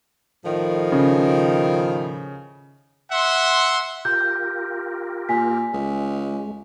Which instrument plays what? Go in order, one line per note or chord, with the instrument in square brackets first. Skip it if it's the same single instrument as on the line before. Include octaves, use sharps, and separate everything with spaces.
[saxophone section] A2 D#3 F3
[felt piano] C#3
[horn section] E5 F#5 C6
[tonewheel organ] F4 G4 A#4 [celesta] G6
[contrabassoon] A#2 [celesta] G#5 B6
[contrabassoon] C#2 [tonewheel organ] G#3